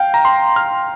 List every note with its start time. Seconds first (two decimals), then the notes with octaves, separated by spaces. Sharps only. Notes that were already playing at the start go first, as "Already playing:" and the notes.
Already playing: F5 G5
0.14 A#5
0.25 C6
0.56 F6